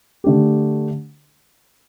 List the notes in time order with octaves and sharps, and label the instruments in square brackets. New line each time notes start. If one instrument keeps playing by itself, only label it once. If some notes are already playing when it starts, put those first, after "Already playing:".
[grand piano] D3 A3 D4 G4